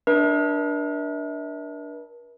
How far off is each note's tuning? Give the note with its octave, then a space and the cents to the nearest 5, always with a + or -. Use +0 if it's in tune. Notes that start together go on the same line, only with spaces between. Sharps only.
D4 +0 A#4 +45 E5 -35